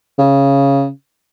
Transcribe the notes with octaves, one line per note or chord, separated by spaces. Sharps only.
C#3